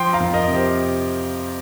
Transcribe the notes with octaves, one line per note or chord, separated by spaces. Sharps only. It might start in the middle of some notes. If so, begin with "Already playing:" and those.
Already playing: F3 G5 C6
F5 A#5
F2
A#4 D#5
C3
G4 C5